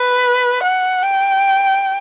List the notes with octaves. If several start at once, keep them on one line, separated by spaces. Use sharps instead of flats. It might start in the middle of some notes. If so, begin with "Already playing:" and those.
Already playing: B4
F#5
G5